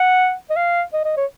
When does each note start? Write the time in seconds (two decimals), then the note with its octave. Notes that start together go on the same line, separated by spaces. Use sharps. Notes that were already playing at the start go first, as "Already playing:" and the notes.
Already playing: F#5
0.50 D#5
0.57 F5
0.93 D#5
1.05 D#5
1.17 C#5